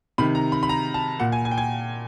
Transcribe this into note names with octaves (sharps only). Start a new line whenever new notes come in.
C3 D#3 B5
A#5
B5
B5
A#5
A5
A#2 F#5
G#5
G#5
G5
G#5